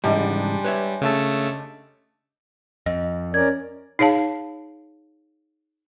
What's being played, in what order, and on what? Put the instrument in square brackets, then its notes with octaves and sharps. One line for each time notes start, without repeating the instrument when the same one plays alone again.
[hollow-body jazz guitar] G#2 C#3 E3 [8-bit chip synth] G3 [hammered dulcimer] G#3 D4 G4
[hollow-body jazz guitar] B4 C#5 E5
[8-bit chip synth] C#3 A3 A4
[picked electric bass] F2 [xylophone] D#5
[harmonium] C#4 A#4 D5 [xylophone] G#6
[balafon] D#4 G#4 C#5 F5 A5